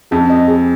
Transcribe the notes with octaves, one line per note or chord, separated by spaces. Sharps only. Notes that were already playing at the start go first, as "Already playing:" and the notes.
F2 G#4
D#5
G#4